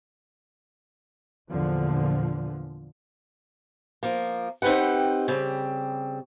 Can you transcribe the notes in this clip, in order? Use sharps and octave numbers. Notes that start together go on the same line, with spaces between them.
E2 A#2 D3 F3
F3 A#3
C4 D#4 G4 B4 F#5
C#3 G3 C4